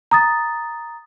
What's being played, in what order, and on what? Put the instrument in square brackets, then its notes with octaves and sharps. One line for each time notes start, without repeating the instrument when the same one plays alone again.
[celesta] A#5 D#6 A6